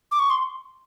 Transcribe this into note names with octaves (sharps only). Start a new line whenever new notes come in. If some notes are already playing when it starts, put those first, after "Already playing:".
D6
C#6
C6